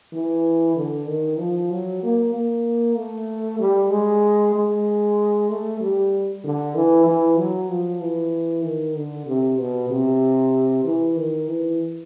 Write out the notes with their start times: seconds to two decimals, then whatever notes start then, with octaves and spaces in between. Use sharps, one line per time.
0.13 E3
0.76 D3
1.08 D#3
1.39 F3
1.71 F#3
2.03 A#3
2.34 A#3
2.97 A3
3.60 G3
3.91 G#3
4.55 G#3
5.49 A3
5.81 G3
6.44 D3
6.75 E3
7.07 E3
7.38 F#3
7.70 F3
8.01 E3
8.64 D#3
8.96 D3
9.27 C3
9.59 B2
9.90 C3
10.84 E3
11.16 D#3
11.48 E3